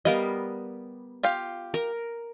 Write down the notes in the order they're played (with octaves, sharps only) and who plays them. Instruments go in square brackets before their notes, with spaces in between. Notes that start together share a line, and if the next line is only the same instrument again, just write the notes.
[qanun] G3 B3 A#4 [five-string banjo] D#5 F5
[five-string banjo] F4 G4 F5
[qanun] A#4